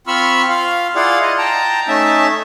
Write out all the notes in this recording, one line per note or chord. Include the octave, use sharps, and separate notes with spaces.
C4 F4 B5 C#6 E6 F6
F4 F5
E4 F4 G#4 D5 F5 F#5
F4 D#5
G5 A5 A#5
A3 C#4 D#4 E5 A5